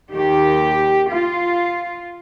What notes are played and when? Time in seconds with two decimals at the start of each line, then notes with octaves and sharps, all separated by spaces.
0.12 D#2 D#3 G4
1.10 F4